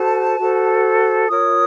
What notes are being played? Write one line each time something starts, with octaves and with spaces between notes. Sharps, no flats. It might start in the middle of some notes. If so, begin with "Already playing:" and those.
Already playing: F#4 A4 C5 A5
F#4 A4 C5
F4 A#4 C#5 D#6